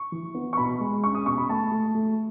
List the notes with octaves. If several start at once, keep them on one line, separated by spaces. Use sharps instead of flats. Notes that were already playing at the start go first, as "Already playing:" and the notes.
Already playing: C#6
E3
B3
C#6
B2 B5
G#3
C#4 C#6
D#6
B2 C#6
B5
A3 A5
A3
A3